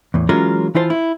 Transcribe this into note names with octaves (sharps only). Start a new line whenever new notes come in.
E2 A2
E3 F#3 G#3 C#4 F4 A#4
E3 E4 F4 C5 A5
E4